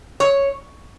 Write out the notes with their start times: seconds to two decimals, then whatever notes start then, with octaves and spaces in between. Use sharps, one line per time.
0.20 C#5